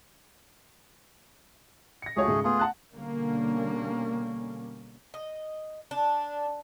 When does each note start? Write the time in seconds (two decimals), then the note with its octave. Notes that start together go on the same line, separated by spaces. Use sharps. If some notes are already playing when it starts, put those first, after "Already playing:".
2.02 A#6 C#7
2.16 C#2 A3 F#4 G#4 C#5
2.28 G#2 C#3 G#3
2.44 A3 B3 F4 G#4
2.59 F#5 A5 F#6
2.95 B2 D3 G3 A#3 C#4
5.14 D#5
5.91 D4